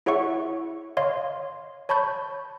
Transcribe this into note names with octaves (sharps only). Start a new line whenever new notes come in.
E4 G#4 C#5 E5 F#5 C#6
C#5 D#5 F5 C6
C#5 A5 B5 C#6 G6